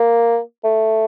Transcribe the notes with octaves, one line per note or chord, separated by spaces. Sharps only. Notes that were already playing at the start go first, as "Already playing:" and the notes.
Already playing: A#3
A3